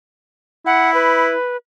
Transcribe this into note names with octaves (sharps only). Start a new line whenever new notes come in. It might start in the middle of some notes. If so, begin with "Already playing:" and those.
E4 F#5
B4